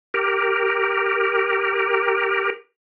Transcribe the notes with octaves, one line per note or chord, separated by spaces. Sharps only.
G4 A#4